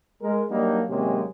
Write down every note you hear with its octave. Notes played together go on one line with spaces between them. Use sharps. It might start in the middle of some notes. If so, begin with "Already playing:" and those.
G#3 A#4
F#3 G3 A#3 D4 D#4
D#2 C3 F#3 G#3 A#3 C#4